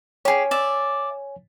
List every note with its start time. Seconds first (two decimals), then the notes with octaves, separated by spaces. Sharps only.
0.25 G4 G#4 C#5 G#5
0.51 D5 E5